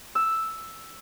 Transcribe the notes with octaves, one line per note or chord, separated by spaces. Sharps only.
E6